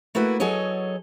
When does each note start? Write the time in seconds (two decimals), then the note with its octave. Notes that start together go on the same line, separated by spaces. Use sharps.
0.15 A3 A#3 E4 F#4 B4
0.40 F#3 G#4 A4 C#5 D#5